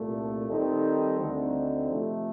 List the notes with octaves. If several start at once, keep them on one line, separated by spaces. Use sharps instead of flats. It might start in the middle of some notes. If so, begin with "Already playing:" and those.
Already playing: C2 A#2 A3
D#3 G3 C4 D#4 A4
D2 D3 A3 C4 D#4
C3 F3 A3